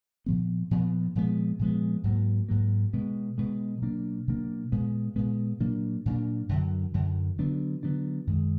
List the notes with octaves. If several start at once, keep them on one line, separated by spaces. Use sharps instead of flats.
A#2 F3 B3
A#2 F3 B3
A#2 F3 G#3 B3
A#2 F3 G#3 B3
G#2 F#3 A#3
G#2 F#3 A#3
B2 G#3 B3
B2 G#3 B3
B2 F#3 A#3 D4
B2 F#3 A#3 D4
A#2 G#3 B3
A#2 G#3 B3
A#2 F#3 A#3 D4
A#2 F#3 A#3 D4
F#2 D3 F#3
F#2 D3 F#3
D3 F#3 B3 D4
D3 F#3 B3 D4
F#2 D#3 G#3